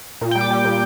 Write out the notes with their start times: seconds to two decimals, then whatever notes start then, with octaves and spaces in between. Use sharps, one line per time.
0.21 A#2
0.31 G5
0.35 G3
0.41 D6
0.51 G3
0.65 A#2